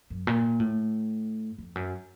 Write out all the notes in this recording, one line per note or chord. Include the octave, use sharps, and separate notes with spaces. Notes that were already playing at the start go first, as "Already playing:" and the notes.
F#2
A#2
A2
F2
F#2